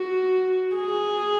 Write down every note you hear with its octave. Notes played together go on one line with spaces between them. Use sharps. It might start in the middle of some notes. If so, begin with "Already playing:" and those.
Already playing: F#4
G#4